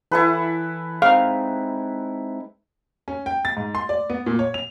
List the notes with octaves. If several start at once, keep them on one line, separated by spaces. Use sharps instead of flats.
E3 E4 A4 B4
G#3 C4 D#4 F5
C#4
G5
A6
G#2
C6
D5
B3
A#2
C#5
F7